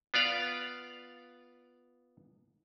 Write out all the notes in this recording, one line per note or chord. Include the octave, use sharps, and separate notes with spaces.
B3 F4 D5 F5